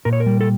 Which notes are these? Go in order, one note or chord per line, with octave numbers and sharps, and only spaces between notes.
A#2 A#4
C#5
A#4
G3
A4